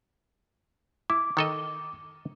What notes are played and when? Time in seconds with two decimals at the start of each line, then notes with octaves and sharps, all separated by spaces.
1.10 E4 D6
1.37 D#3 A4 D#5